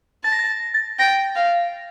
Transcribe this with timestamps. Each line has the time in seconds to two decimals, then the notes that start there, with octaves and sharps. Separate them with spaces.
0.24 A5 A6
0.32 A#6
0.39 A6
0.74 A6
0.99 G5 A#6
1.36 F5